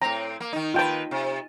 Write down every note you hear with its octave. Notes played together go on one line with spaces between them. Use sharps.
A2 C4 A#5
A#3
D#3 D#4
D#3 F4 B4 G5 A5
C3